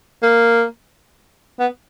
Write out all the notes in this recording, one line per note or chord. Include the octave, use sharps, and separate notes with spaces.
A#3
B3